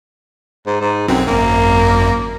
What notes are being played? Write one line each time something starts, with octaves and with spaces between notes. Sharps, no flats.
G#2
G#2
B1 F#2 C4
G#1 F#2 A#3